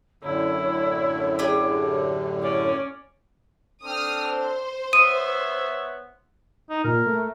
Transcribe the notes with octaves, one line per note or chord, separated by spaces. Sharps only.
F#2 A2 D3 E4 C#5
G4 G#4 G5
C#4 C#5 D5
C4 D4 A4 D#6 F6
C5
B3 C#5 E5 D#6 D#7
D#4
A#2 A#4
A3